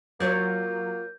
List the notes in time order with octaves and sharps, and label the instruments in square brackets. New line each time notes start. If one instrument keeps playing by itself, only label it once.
[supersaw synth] F#3 [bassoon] A#3 [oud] F4 C#5 D5 [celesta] G6